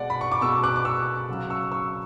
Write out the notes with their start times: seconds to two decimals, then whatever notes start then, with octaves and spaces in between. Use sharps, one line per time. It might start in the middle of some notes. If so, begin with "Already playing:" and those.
Already playing: B2 G#3 D5 F#5
0.10 B5
0.21 C#6
0.32 D6
0.41 B2 G#3 C#6 E6
0.63 D6 F#6
0.76 D6
0.85 C#6 E6
1.28 C#3 F#3
1.50 C#6 E6
1.72 C#6 E6